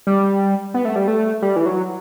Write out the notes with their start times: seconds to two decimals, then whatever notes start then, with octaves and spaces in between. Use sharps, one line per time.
0.07 G3
0.74 B3
0.85 A3
0.96 G3
1.08 A3
1.42 G3
1.56 E3
1.66 F#3